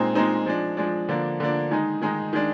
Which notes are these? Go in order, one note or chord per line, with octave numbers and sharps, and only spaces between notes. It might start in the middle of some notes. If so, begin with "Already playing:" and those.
Already playing: A#2 G#3 C4 D#4
A#2 G#3 C4 D#4
F3 G#3 D4
F3 G#3 D4
D3 F3 A#3 D4
D3 F3 A#3 D4
D#3 G#3 D#4
D#3 G#3 D#4
D#3 G#3 D4